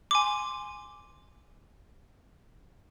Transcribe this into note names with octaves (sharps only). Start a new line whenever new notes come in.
G#5 C6 D6